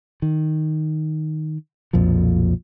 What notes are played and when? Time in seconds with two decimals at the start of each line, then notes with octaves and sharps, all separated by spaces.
0.22 D#3
1.93 B1 F2 A#2 F3